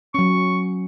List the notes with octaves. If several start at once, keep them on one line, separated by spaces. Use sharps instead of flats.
F#3 C#4 C#6